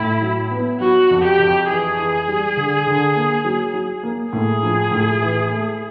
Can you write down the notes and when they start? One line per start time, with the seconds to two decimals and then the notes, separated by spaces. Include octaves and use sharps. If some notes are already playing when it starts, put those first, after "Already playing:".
Already playing: A2 E4
0.22 F#3
0.51 B3
0.80 F#3 F#4
1.11 F2
1.24 G4
1.39 F2
1.69 E3 G#4
1.98 E3
2.28 G3
2.57 D3
2.87 D3
3.16 A#3
3.45 F#3
3.74 F#3
4.03 A#3
4.32 A2 G#4
4.63 F3
4.91 A2
5.21 E3
5.50 A3